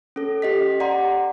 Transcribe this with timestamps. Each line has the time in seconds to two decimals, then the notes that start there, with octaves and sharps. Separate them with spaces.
0.16 C#4 A4
0.42 G4 D#5 B6
0.80 D5 F#5 A#5 C6